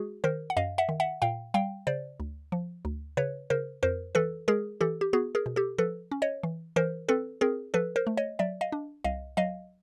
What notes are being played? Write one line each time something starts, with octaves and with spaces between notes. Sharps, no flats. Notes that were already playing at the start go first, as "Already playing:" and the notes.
Already playing: G#3 F#4 G#4
D#3 A#4 C5
F#5
F#2 D#5 F5
E5 F#5
D#3
E5 F#5
A#2 F5 G5
G3 F5 G5
C#3 C5 D5
D2
F3
D2
C#3 B4 C#5
C#3 A#4 C5
F2 A#4 C5
E3 A4 B4
G#3 G#4 A#4
E3 G4 A4
G4
B3 F#4 G#4
G#4 A#4
B2
G4 A4
F3 A4 B4
C#4
C#5 D#5
E3
E3 A#4 C5
C4 A4 B4
C4 G#4 A#4
F3 A4 B4
A#4 C5
A3
C#5 D#5
F#3 D5 E5
D#5 F5
D4
C2 D#5 F5
F#3 D#5 F5